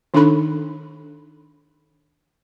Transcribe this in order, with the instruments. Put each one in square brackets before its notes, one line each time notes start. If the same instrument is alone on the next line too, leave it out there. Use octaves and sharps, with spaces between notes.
[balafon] D#3 D4 D#4 A4 B5